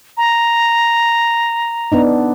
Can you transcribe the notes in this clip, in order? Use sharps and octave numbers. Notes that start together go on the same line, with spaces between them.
A#5
B3 D4 D#4